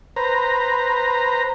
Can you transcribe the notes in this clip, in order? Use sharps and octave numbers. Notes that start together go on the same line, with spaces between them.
B4 C5 A#5